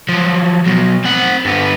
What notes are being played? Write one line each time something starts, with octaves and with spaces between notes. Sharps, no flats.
F3 F#3
B2 F#3
C4 F#5
G2 B3